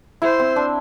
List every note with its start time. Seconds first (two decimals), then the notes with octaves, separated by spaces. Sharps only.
0.22 E4 C5
0.39 C4
0.56 D4